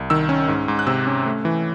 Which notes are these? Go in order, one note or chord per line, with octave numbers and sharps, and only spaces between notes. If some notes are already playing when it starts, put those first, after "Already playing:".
Already playing: C2
D#3 E6
C#4
G#2
G#2
F#6
C3 E6
C#4
A3
E3